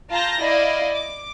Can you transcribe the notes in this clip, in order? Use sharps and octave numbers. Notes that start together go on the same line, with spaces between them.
F4 A5 A#5 G6 A#6
E4 D5 D#5 F5
D6